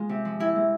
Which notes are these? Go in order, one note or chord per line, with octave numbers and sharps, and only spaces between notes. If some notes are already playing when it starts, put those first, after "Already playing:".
Already playing: G#3 F4
C3
F3
C3 E4
G#3